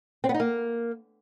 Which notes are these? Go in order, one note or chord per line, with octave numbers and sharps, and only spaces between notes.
C4
B3
D#4
A#3